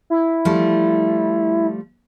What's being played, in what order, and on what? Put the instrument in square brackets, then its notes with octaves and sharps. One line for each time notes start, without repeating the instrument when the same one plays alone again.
[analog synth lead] E4
[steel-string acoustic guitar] F3 G3 A3